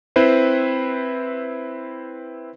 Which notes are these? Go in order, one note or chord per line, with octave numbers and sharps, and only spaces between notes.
C4 E4 B4 C5